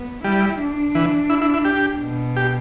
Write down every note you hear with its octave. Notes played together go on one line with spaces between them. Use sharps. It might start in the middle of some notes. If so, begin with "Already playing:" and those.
Already playing: B3
G3 E4
D4
E3
E4
E4
E4
G4
B2
G4